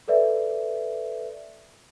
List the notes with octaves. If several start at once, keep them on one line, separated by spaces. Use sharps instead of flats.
A4 B4 D5 E5